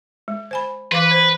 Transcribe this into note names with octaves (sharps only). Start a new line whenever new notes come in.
G#3
C5 G#5 B5
E3 B4 F5 D6
C5